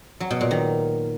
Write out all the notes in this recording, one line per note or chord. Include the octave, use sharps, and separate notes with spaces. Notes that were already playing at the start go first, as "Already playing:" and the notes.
F#3
B2
A#2
D#3